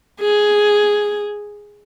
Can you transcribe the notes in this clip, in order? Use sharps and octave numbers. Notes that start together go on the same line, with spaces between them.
G#4